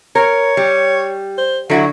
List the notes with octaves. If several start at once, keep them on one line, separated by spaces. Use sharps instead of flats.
A#4 C#5
G3
C5
D3 F#3 E4 F#4